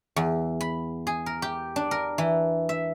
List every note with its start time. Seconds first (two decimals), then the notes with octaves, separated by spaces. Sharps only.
0.16 E2
0.61 B5
1.07 G#4
1.26 A#4
1.42 G4
1.76 D4
1.91 A#4
2.18 E3
2.69 E5